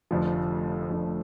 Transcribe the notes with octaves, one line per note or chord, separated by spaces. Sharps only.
F1 F2 D3 F3 A3
F1 F2 D3 F3 A3